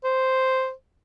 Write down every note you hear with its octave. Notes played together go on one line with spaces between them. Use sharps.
C5